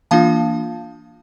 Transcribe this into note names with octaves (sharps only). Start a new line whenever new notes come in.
E3 A#3 D4 F4 F5 A5